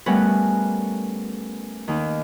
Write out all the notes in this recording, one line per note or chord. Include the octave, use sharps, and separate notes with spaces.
G3 A3 B3 C#4 A#4 B4
D#2 D#3